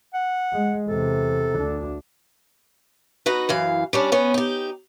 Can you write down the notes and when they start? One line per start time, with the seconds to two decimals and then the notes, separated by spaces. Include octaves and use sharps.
0.14 F#5
0.53 G#3
0.88 E2 C3 A4
1.56 D2 D4
3.26 D#4 F#4 B4
3.49 F#2 E3 F5
3.93 G3 C#4 D4
4.12 B3 C#4
4.34 D#4 G4